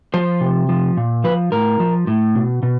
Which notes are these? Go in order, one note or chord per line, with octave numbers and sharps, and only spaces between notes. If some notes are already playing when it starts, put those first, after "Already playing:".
F3 C5
C3
F3
A#2
F3 B4
A2 A#4
F3
A2
B2
B2